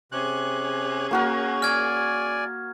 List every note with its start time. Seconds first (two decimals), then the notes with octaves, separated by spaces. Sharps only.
0.12 C3 C#4 G#4 F#6
1.11 A#3 F#4 A#4
1.62 D5 G#5 F6 G#6